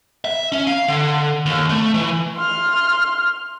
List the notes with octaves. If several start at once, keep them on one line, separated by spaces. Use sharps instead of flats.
E5
C#4
F5
D3
D#2
A3
E3
C6 F6